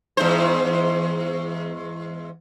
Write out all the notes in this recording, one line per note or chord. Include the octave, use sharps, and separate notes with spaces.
E2 G#2 C5